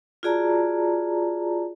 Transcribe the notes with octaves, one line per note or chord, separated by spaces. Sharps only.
F4 F#4 G#4 D5 A5 A#5